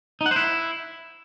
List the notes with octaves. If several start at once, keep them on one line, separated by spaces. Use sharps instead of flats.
D#4
F#5
C5
E4